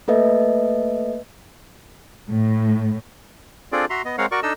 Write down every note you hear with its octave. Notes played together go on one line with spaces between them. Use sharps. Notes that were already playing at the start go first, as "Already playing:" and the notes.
A3 A#3 A4 B4 D#5 E5
A2
C4 D4 F4 G#4 A4 D5
F#4 E5 A#5 C6
B3 D#5
G#3 C4 A#4 C#5 F5 F#5
F#4 A#4 D5 C#6
D4 D#4 A4 D#5 E6